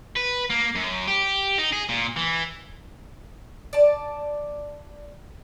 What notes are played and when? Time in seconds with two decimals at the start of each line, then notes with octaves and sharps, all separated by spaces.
0.16 B4
0.50 A#3
0.75 F#2
1.07 G4
1.58 D#4
1.72 G#4
1.89 A#2
2.17 E3
3.73 D5 A5